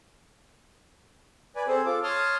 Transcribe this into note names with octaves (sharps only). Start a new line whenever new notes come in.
B4 D5 G#5
C4 G#4 A4 C5
F4 A4 D6
C#5 A5 C6 D#6 F6